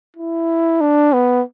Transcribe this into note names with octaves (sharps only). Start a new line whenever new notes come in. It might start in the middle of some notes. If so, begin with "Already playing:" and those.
E4
D4
B3